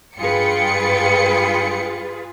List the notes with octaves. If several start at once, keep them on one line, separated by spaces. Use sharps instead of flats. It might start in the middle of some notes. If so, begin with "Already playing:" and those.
G2 F4 G#4 B4 G5 C#7